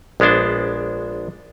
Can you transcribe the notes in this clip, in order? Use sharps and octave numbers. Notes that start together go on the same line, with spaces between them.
A#1 G#3 B3 D4 C5